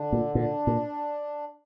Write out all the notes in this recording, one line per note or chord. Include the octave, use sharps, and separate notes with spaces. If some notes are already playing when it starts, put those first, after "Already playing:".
Already playing: D3 D4
A#2
A#2 D4
A#2